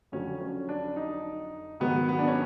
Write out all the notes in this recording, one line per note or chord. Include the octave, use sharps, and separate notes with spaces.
F2 D3 F#3 C#4
C#4
D4
D#4
G#2 D#3 F#3 B3
B3
D4
C#4